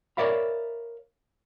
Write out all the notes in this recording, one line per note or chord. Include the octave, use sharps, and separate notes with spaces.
A#4 C#5 D5 E5 F5 B5